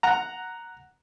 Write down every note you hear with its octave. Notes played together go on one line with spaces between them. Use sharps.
F#5 A#5